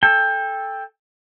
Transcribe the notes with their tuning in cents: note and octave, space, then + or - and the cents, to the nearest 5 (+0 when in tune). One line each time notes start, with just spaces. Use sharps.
A4 -5 G5 +20